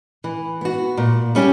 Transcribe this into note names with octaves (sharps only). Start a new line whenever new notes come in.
E3
B3 F#4
A#2
G3 C#4 G4